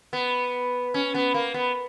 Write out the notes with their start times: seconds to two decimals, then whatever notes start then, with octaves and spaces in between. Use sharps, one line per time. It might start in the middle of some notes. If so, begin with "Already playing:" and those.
0.13 B3
0.94 C#4
1.15 B3
1.34 A#3
1.54 B3